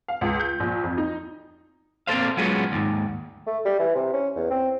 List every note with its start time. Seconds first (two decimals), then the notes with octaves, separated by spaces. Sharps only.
0.08 F5
0.21 C#2
0.40 G6
0.60 A#1
0.84 F2
0.98 D#4
2.07 A#3 C4 C#4 A4 C5 F5
2.37 F#3 G#3 B3 C#4 F4 G#4
2.72 D#2 G#2
3.47 A3
3.65 G3
3.79 E3
3.95 C3
4.13 C#4
4.36 E2
4.50 C4